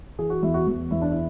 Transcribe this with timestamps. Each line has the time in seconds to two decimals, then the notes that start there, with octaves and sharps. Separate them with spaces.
0.18 E3 G#4
0.30 F#4
0.43 E2 E4
0.54 F#4
0.67 E2
0.91 E2 E4
1.01 D4
1.11 E4